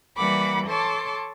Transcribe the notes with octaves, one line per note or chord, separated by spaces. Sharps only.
E3 G3 A#3 F#5 B5 D6
A4 C#5 A5 C6 D6